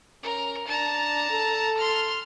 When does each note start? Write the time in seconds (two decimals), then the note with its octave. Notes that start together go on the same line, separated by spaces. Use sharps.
0.23 C#4 A#4
0.68 D4 A5 A#5
1.30 A4
1.78 C6 F6